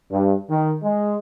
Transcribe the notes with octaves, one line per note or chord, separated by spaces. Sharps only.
G2
D#3
G#3